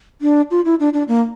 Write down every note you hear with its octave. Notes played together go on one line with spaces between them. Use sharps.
D4
F4
E4
D4
D4
A#3